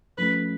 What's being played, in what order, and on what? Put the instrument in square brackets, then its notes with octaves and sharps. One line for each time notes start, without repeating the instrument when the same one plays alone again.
[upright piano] F3 A3 C#4 [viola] B4